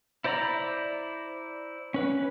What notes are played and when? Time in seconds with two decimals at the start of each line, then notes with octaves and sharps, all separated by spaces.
0.24 E4 C5 D5 A#5 B5
1.94 C#4 B4